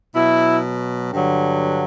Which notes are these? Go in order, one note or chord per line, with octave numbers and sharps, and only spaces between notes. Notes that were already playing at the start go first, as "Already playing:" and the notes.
B2 F#3 E4
G2 D3 F#3